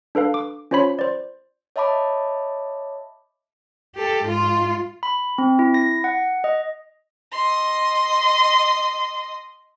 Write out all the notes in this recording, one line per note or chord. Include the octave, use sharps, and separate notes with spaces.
D4 A4 B4 F5
D6
C#4 F4 C5 C#5 B5 B6
C5 D5
C#5 D#5 E5 A5 B5 D6
G4 A4
G#2 F4
B5
C4
E4
A#6
F#5
D#5
D#5 C6